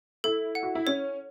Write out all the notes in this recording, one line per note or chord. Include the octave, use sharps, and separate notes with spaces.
E4 A4
F#5
F#4
E4
C#4 C#5